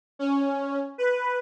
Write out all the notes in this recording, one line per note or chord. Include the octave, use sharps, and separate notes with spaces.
C#4
B4